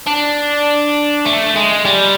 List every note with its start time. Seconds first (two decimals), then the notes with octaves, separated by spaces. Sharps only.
0.06 D4
1.26 A3
1.56 G#3
1.85 G3